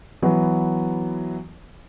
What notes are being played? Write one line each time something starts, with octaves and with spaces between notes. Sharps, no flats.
E3 F#3 B3